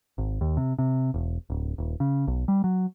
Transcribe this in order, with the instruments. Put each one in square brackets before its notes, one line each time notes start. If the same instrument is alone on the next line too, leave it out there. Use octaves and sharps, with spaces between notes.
[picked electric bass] G#1
D#2
C3
C3
E1
D1
D#1
C#3
B1
G3
F#3